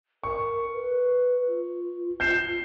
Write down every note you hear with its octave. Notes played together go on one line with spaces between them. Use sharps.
A#4 C#6
B4
F4
G6 C7 E7